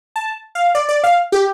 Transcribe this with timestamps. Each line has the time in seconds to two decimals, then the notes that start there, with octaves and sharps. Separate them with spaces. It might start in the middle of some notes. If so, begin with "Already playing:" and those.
0.16 A5
0.55 F5
0.75 D5
0.89 D5
1.04 F5
1.32 G4